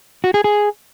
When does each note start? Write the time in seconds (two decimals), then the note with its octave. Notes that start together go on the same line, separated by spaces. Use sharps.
0.24 F#4
0.34 G#4
0.44 G#4